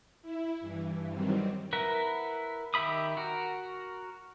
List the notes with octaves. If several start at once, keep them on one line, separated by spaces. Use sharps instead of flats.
E4
G2 E3
D#3 F#3 G3 C4
E4 A#4 B4 F#5
D#3 G4 E5 B5 D#6
F#4 A#4